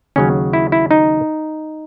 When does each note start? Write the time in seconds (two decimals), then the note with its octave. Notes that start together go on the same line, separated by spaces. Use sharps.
0.16 D#2 C#3 F#3 C#4
0.53 E4
0.72 E4
0.91 D#4